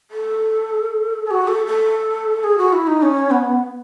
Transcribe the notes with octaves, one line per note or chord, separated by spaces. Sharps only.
A4
G#4
F#4
A4
A4
G#4
F#4
E4
D#4
C#4
B3